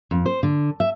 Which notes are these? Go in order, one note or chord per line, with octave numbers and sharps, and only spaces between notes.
F2
C5
D3
E5